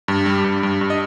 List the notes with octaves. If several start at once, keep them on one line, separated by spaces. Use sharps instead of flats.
G2
G3
G2
G2
G2
D#5